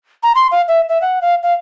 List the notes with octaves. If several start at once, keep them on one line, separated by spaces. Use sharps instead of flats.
A#5
C6
F5
E5
E5
F#5
F5
F5